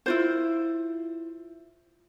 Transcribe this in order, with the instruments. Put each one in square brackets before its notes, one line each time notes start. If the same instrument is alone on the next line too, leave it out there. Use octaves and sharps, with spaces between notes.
[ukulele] E4 F4 C5